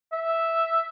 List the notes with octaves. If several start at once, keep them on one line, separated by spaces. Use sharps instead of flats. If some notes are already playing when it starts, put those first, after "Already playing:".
E5